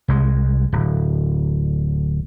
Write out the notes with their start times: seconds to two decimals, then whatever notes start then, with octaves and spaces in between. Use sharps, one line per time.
0.08 C2 G#3
0.73 D1